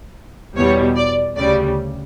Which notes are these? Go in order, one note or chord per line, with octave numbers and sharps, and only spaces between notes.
E2 B2 G3 C#5
D5
D2 C#3 G3 D5